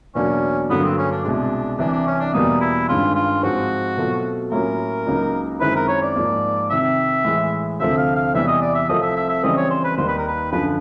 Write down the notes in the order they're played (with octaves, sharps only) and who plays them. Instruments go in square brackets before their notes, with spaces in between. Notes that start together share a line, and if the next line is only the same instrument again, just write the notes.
[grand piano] E2 B2 F#3 A#3 D4 [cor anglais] C#4
[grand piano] G2 D3 F#3 A#3 [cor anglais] B3
[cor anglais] C4
C#4
D4
[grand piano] C2 B2 G#3 [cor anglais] D4
[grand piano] C2 C3 E3 [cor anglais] D4
[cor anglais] D4
C#4
D4
[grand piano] E2 B2 G3 A#3 [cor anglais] D#4
[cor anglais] E4
[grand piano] G2 D#3 G#3 C#4 [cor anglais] F4
[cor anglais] F4
[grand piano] G#2 F3 G#3 C4 D#4 [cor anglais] F#4
[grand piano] B2 F#3 A3 C4 F4
[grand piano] A2 F#3 A#3 C#4 F4 [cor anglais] A#4
[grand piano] C#2 C#3 F#3 A#3 D#4
[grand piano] F#2 D#3 G#3 C4 E4 [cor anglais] B4
[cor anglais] A#4
C#5
D5
[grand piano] G#2 F3 A#3
[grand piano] F2 C3 D#3 [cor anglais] E5
[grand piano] A2 E3 G#3
[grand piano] D2 C3 F3 A3 C4 [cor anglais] E5
[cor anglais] F5
F5
[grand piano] E2 C3 E3 G3 [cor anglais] E5
[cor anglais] D#5
D5
E5
[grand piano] C2 C3 F3 A3 C4 [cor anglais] D#5
[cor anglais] E5
E5
E5
[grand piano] F2 C#3 E3 G3 C4 [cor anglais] D#5
[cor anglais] C#5
C5
B4
[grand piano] D#2 D#3 G3 A#3 D#4 [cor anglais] C5
[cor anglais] B4
A#4
B4
[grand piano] F#2 D3 F3 [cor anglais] B4